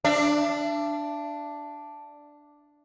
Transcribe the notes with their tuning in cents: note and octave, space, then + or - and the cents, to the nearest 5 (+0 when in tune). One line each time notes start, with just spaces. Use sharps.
D4 +0 E5 +40